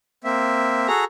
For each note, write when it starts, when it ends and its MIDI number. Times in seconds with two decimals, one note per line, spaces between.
0.24 0.88 58
0.24 0.88 60
0.24 0.88 76
0.88 1.04 66
0.88 1.04 68
0.88 1.04 69
0.88 1.04 82